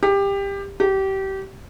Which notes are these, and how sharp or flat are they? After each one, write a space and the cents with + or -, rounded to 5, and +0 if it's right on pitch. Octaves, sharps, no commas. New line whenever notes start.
G4 +20
G4 -25